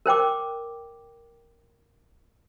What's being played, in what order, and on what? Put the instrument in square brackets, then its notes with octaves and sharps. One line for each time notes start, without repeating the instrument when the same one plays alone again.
[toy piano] A#4 C5 G5 D6